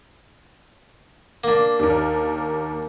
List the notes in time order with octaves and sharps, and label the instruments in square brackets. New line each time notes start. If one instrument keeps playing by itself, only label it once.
[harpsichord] A#3 D4
[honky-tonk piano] D#2 A#4